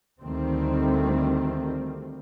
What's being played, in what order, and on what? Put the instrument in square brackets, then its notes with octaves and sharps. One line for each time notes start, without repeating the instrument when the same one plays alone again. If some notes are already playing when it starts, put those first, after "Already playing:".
[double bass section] D2 D#3 G3 A3 C4